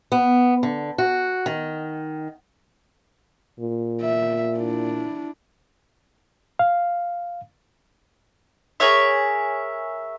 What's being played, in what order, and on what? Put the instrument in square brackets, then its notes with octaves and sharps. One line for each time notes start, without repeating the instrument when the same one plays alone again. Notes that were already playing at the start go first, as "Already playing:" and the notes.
[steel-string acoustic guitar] B3
D3
F#4
D#3
[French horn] A#2
[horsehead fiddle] E5
D4 E4
[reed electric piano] F5
[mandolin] G#4 A#4 C#5 E5